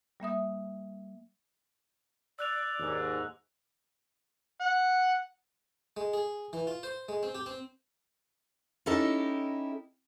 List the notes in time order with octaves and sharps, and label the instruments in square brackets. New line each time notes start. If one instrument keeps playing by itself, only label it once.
[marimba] G3 A#3 E5 D#6
[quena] D5 [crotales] E6 F#6 F7
[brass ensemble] D#2 G#2
[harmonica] F#5
[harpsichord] G#3
G#4
E3
F4
C5
G#3
C4
G4
C4
[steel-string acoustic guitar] C#4 D#4 E4 G4 A4 D#5